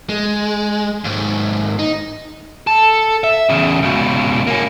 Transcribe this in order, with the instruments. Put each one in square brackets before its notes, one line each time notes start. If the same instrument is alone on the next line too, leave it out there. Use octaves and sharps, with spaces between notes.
[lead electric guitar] G#3
D#2 G#2
D#4
[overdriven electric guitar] A4
E5
E2 C#3
C#2 B2
A#3 C#4